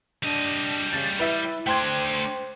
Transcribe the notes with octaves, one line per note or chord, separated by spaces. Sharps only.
G3 D4 D#5
C#3 A6
E4 B4 E5
A3 D4 C5 G5 C6 G#6